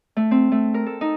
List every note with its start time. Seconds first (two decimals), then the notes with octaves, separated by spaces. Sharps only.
0.17 A3
0.31 C4
0.52 A3
0.74 A#4
0.86 A4
1.01 D#4